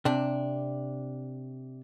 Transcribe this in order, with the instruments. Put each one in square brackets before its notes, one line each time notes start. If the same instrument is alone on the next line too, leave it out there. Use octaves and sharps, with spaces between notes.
[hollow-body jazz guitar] C3 D4